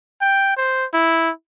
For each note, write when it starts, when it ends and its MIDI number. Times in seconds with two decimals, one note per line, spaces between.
0.21 0.56 79
0.57 0.85 72
0.93 1.31 64